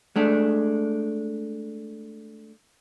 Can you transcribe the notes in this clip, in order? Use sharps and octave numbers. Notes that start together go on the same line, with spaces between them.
G#3 A3 D4